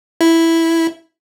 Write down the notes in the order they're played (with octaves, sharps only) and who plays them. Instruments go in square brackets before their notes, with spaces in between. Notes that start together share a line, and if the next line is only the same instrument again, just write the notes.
[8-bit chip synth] E4